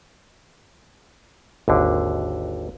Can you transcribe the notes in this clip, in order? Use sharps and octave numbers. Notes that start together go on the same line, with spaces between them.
G#1 D#2 D3